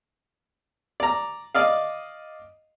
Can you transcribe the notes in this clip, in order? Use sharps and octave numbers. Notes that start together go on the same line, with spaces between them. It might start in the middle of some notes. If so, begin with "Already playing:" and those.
D5 A#5
D5 D#5 F5